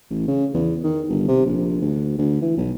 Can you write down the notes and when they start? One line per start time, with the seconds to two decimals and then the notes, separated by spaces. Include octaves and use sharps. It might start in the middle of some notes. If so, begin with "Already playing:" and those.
0.10 A1
0.28 C#3
0.54 E2
0.84 D#3
1.09 G1
1.28 C3
1.46 A#1
1.82 D2
2.18 D2
2.42 E3
2.57 B1